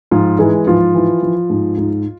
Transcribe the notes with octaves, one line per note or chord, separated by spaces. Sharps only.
G#2 F3 F4
E3 G#3 G#4
G#2 F3 F4
E3
F3
G#2
G#2